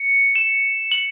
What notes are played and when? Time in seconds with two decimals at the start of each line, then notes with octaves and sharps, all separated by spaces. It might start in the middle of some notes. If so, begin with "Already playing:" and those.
Already playing: C#7
0.35 E7
0.92 F#7